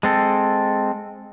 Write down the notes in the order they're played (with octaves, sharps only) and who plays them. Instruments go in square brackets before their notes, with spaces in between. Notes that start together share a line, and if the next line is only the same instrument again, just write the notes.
[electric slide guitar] G#3 C4 A4